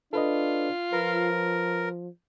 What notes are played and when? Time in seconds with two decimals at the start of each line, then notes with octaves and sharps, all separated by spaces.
0.13 D4 F4 A4 B4 D#5
0.93 F3 A#4 B4